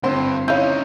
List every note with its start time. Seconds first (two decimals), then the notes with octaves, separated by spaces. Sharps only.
0.03 G1 G2 C4 C6
0.48 C#4 D#4 E4 C#5 F5 G6